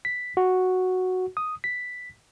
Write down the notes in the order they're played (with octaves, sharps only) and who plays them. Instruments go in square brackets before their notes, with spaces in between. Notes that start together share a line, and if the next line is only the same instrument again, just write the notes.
[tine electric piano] B6
F#4
D#6
B6